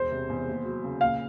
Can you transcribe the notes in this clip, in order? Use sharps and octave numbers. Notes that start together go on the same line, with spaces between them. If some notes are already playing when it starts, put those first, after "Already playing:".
Already playing: E1 C5
C3
E2
D#2
F#3
C#3
A#2 F5